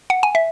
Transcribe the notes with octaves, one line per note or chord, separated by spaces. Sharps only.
F#5
G#5
E5